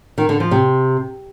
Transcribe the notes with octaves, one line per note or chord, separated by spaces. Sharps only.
D#3
D3
F3
C3